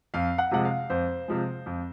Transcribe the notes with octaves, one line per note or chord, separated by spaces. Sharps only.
F2 F5
F#5
C3 F3 G#3 F#5
F5
F2 C5
C3 F3 G#3
F2